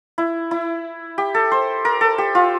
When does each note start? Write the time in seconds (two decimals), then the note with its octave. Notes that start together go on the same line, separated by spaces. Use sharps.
0.18 E4
0.51 E4
1.18 G4
1.34 A4
1.52 C5
1.85 A#4
2.01 A4
2.18 G4
2.35 F4